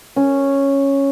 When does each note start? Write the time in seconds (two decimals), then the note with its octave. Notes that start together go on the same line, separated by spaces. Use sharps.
0.16 C#4